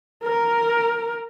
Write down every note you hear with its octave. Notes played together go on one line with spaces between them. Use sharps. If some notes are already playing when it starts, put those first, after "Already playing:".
A#4